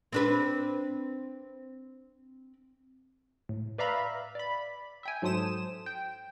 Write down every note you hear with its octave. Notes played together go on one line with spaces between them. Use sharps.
C4 D4 B4
A2
B4 D5 E5 F5 A#5 B5
D5 B5
E5 G5 G#5
G#2 F#3 A4 C5 D#6 E7
G5